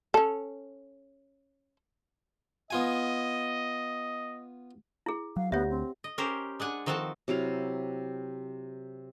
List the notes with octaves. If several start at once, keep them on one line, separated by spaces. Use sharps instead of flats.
C#4 A4
B3 F4 D#5 G#5
E4 G#4
F#3 F5
D2 B3 G4 C#5 E5 F#5
C4
D#5
C#4 G4 A#4 C5
G#3 D4 F#5 G#5
D#3 F3 C4 F#4 A4 A5
C3 F#3 E4 F5